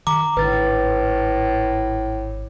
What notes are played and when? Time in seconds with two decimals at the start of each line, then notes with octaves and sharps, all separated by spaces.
0.07 D#3 A#5 D6
0.37 G#1 A2 D3 B4 A6